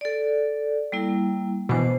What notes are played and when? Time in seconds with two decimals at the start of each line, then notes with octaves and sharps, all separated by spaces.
0.01 A4 D5
0.92 G3 A#3 E4
1.69 B2 E3 D4 C5